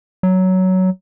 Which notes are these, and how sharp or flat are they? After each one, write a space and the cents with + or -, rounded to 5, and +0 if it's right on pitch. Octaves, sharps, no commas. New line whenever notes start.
F#3 +10